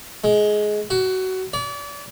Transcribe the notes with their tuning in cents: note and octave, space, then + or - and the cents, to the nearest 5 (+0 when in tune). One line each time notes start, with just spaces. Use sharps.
G#3 +15
F#4 +20
D5 -35